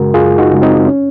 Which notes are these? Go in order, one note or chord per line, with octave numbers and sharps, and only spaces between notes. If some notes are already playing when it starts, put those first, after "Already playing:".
Already playing: F#2 C#3 G#3 F#4 A#4
F#2 F4 G#4
D#4 F#4
C#3 G#3
C4 D#4
C#4